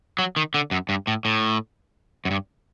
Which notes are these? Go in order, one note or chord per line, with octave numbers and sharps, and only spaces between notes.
F#3
D#3
D3
F#2
G2
A2
A2
F#2
G2